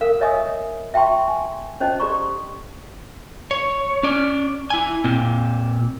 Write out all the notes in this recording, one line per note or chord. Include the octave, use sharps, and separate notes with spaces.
A4 A#4 F5
A#4 C#5 D#5 E5 G#5 D#6
E5 G5 A5 C6 C#6
G#5 C6
C#4 C5 D#5 A5
G4 A4 D5 A#5 C6 C#6
C#5
C#4 D5
E4 G#5
A#2 C4